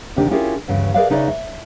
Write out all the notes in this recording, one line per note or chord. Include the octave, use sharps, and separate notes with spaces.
D2 C3 D#3 D4 G4
C#4 E4 F4 G4 G#4 A#4
D2 G2 C#3 E3
G#4 A#4 B4 D5 E5 F5
C#3 D#4 E4 B4 D5 E5
E5